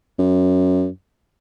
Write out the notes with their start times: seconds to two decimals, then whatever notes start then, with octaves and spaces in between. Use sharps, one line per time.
0.19 F#2